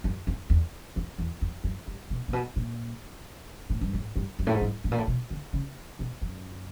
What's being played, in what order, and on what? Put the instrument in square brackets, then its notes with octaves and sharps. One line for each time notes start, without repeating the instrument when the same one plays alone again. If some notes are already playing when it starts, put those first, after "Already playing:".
[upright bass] F#2
F2
E2
F2
E2
F2
F#2
G2
B2
A#2
B2
A#2
A2
G2
G#2
G2
F#2
A2
G#2
G2
A2
A#2
A2
B2
D3
C#3
B2
F#2